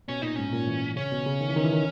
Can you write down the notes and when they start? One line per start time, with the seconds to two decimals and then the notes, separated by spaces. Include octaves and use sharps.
0.08 B2 C#4
0.22 A#2 D#4
0.36 G#2 C#4
0.53 A#2
0.68 E3
0.96 C#3 C#4
1.12 B2
1.26 C#3
1.41 D#3
1.49 E3
1.56 D#3
1.64 E3
1.73 D#3